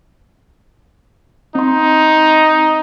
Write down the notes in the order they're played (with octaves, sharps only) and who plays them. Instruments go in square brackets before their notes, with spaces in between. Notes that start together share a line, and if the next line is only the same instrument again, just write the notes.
[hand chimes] C4 C6 [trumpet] D#4